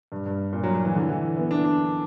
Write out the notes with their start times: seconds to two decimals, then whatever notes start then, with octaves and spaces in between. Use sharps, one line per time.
0.12 G2
0.26 G2
0.53 A#2
0.63 F#3
0.74 F#3
0.85 E3
0.95 D3
1.09 E3
1.37 B3
1.51 D4
1.64 D4